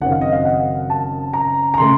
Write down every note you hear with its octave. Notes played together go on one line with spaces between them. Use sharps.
F#1 F#2 D#3 F#3 C4 F#5
F5
D#5
F5
F#5
A5
A#5
A#5
C#3 A3 C6